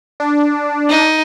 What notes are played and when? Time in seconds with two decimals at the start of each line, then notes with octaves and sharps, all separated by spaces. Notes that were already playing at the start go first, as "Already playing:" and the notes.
0.20 D4
0.89 D#4